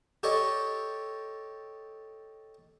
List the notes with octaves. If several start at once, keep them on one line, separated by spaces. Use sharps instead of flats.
G4 A4 C#5 D#5